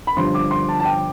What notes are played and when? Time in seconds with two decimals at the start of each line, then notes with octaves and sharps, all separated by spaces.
0.07 B5
0.16 G1 G2 F3 C6
0.34 D6
0.51 C6
0.68 A5
0.80 A5
0.85 G5